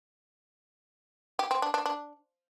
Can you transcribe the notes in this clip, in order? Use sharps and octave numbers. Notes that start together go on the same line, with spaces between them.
G4
C4
D4
D4
D4